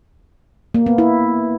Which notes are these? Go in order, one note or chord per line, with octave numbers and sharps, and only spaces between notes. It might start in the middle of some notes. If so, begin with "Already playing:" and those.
A#3
B3
E4